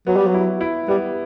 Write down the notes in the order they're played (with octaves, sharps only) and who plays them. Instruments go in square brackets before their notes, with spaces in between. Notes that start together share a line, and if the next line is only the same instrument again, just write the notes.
[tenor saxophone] F#3 [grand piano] B3
[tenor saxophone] G3
F#3
[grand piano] E4
E4
[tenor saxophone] G3 [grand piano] B3